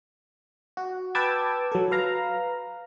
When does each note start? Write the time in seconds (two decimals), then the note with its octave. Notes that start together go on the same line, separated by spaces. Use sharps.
0.77 F#4
1.15 B4 G5 A5 D6 E6 G#6
1.72 F#3 A4
1.91 B4 F5 A#5